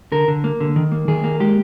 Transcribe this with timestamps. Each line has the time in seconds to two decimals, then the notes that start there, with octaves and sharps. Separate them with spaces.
0.12 D3 A#4
0.28 D3
0.44 A#3
0.60 D3
0.76 D#3
0.92 A#3
1.08 D#3 G#4
1.24 A#3
1.40 G#3 G4